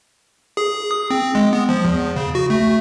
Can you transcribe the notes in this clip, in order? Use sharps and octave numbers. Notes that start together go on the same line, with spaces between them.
G#4
D#6
C4
G#3
B3
F3
E2
C#3
F#4
A3